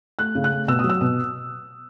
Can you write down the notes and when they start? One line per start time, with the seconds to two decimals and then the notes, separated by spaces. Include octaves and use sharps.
0.19 A3 F#6
0.35 C#3
0.44 F#6
0.52 A3
0.68 B2 E6
0.79 D#6
0.84 F#3
0.89 E6
1.01 B2